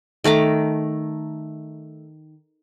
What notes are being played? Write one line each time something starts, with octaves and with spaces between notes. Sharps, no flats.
D#3 A3 A#5 D6